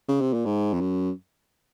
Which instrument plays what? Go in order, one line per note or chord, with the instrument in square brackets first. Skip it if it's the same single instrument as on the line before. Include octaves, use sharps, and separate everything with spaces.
[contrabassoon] C#3
C3
A#2
G#2
F2
F#2